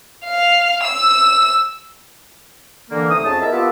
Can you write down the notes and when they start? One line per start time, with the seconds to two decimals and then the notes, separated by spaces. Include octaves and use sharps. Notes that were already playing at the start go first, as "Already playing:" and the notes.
0.25 F5
0.84 E6
2.91 D3 E3 A#3
3.10 C2 A3 D#4 D#6
3.25 F2 C#4 G#4 A5
3.41 B3 D#4 E4 A#4 E5
3.53 B3 F4 G4 A#4 E5 A5